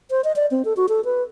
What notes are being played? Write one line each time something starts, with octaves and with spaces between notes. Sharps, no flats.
C5
D#5
D5
C4
A4
F#4
A4
B4